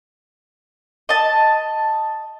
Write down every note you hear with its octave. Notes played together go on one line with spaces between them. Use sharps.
D#5 A5